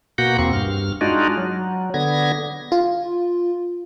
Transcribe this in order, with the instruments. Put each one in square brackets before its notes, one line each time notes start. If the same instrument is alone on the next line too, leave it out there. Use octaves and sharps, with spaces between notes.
[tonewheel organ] B2 A#3 F#4 F#5 G6
E2 A#3 C4 C#6
G2 F6
G#3 D4 D#4 F4 F#4
F#3
D3 B3 G#6 A#6
[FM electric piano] F4